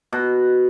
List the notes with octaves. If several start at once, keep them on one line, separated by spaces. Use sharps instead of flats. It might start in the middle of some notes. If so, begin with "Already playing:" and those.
B2